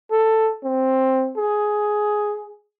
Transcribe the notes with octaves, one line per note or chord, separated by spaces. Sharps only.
A4
C4
G#4